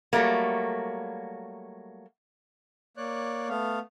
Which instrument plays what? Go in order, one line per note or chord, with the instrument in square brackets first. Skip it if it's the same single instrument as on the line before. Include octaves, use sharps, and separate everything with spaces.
[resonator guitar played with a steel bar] F#3 G3 A3 A#3
[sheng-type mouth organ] A#3 C#5 D5 F#6
A3 B3 F5